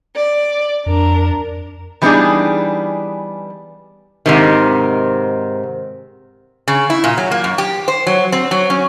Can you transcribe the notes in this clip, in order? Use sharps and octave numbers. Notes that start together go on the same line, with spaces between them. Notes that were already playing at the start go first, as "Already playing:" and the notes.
D5
F2 D4 A#4
E3 G3 B3 D4 D#4 G#4
G#2 C3 D#3
C#3
E4
A#2
F#3
A#3
F#2
G4
C5
F#3
C4
F#3
C#4